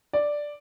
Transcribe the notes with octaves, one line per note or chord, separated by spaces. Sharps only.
D5